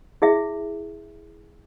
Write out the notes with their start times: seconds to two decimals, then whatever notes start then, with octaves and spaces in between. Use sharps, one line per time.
0.22 E4 G#4 E5